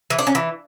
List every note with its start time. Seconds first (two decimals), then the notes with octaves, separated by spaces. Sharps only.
0.10 E3
0.19 D4
0.27 C#4
0.35 E3